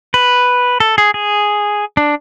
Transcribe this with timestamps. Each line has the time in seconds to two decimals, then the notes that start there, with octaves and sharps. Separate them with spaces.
0.14 B4
0.80 A4
0.98 G#4
1.14 G#4
1.97 D4